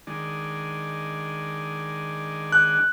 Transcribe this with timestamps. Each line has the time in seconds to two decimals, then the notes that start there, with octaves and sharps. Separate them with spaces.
0.07 D#3 G#3 D4
2.52 F#6